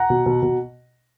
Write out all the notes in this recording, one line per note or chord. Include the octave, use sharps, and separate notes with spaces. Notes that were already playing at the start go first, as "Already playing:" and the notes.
Already playing: F#5 A#5
B2
B2
B2